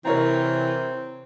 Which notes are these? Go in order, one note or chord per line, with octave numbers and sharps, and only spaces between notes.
C3 E3 C4 A#4 C#5 A#5